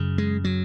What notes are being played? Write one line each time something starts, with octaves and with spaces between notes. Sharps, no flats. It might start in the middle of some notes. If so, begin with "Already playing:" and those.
Already playing: F#2 C#3
G#3
F#3